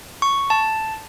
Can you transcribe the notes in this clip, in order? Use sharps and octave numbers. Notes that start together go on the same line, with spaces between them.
C#6
A5